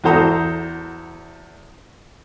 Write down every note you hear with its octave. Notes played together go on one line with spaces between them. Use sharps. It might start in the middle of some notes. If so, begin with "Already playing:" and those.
E2 F#4 A4 C5 A#5 D#6